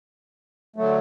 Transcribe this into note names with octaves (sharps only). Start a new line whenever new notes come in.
D3 F#3 A3